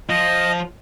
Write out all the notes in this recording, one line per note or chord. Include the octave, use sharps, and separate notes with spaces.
F3 D#5